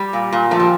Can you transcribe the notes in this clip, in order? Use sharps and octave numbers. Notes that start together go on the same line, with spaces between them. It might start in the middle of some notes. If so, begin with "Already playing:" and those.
Already playing: G3
A#2
A#2
F3 A3
G3